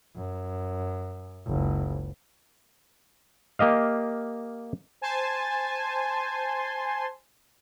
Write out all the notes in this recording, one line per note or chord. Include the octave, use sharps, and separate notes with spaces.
F#2
F#1 C#2
A#3 G4 D#5 F5
C5 G#5 A5 C6